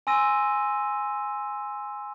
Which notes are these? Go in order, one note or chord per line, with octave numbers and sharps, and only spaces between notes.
G#5 C6 E6 A#6 D#7